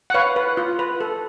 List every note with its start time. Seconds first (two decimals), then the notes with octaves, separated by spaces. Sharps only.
0.10 F#5
0.14 B4 C#5 F5
0.36 B4
0.57 F4
0.79 B4
1.01 A4